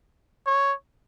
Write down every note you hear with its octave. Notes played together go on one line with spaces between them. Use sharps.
C#5